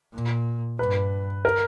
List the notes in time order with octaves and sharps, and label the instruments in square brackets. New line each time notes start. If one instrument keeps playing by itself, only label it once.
[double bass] A#2
[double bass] G2 [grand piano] B4
[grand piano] A#4